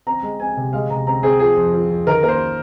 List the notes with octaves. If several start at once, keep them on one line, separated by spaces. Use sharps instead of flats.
C4 A#5
G#3
C4 G#5
C3
G#3 F5
C3 A#5
C4 A#5
C4 G#4
F3 G#4
F2
F3
F2
D#3 A#4
A#3 A#4
C5